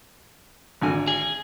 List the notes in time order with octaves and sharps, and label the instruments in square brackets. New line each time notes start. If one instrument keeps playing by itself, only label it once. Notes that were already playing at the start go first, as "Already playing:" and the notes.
[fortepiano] G#1 D3 G#5
[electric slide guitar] G#4